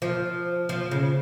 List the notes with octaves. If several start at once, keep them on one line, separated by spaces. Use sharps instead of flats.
F3
F3
C#3